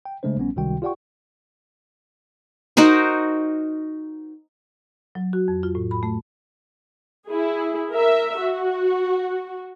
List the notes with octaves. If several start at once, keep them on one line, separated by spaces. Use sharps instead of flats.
G5
C#3 G#3 A3 D4 C5
A#1 G3 B3 C#4
C#2 C3 D#3 G3 F#4 G5
F4 G4 D5 F#5 G5 C#6
D#4 F#4 A#4 C5
F#3
F#4
F2
F4
A2
B5
A3
E4 G#4
A#4 E5
F#4